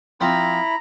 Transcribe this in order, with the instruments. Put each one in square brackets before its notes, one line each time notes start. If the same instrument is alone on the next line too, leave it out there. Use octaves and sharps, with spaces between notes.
[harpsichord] F3 C4 [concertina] E4 B5 [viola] A#5